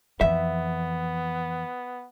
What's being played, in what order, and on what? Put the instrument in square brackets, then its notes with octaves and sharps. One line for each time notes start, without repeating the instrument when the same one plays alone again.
[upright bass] F2 E3 [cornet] B3 [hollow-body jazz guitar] E5